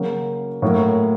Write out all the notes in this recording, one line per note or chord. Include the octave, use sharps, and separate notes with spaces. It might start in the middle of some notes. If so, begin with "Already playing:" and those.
Already playing: C#3 F#3 A#3
A2 F#3 A#3